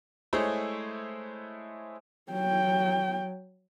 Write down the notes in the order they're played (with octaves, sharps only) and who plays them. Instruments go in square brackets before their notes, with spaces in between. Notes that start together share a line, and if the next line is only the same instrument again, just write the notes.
[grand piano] G#3 A3 E4 G#4 C5 C#5
[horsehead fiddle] F#3 G5